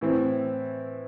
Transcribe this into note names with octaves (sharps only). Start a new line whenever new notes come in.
A2 E3 C4